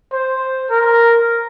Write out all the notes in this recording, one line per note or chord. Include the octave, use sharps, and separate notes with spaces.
C5
A#4